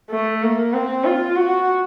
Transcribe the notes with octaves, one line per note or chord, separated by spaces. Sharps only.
A3
A#3
C4
F4
F#4